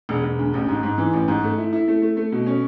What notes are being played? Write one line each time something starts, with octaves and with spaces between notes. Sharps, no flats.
E1
E1
D2
A1
G#2
G#2
E3
A1
G#2
A3
E4
E4
A3
A3
A3
B2
C#4